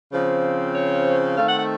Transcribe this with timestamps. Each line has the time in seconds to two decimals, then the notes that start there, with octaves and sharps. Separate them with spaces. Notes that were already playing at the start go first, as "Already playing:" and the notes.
0.12 C#3 F3 C4
0.75 C#5
1.37 D#3 A3 C4 F5
1.48 F#5
1.59 F#5